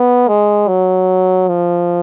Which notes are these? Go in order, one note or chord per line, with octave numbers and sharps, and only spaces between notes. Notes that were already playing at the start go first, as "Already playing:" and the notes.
Already playing: B3
G#3
F#3
F3